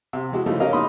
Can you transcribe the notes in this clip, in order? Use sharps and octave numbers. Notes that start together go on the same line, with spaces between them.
C3
E3 G#3 F#4
C#3 E3 F3 A3 D#4 F#4
C#4 G4 A#4 D#5 F5
A#2 D#4 B5 C6 D#6